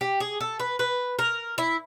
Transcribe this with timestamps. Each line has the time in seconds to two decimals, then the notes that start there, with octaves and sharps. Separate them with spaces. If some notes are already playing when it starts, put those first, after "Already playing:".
0.01 G4
0.20 G#4
0.41 A4
0.59 B4
0.79 B4
1.19 A#4
1.58 E4